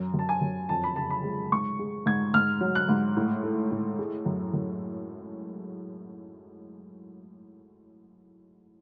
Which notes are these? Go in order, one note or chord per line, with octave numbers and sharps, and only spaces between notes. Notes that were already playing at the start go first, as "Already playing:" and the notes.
Already playing: F#2
F#2 A5
G#5
F#2
F2 A5
B5
C#3 A5
B5
G#3
G#2 C#6
G#3
G#2 G#6
G#2 F6
F#3
F#6
G#2
A2
A3
A2
G#3
F#2
F#2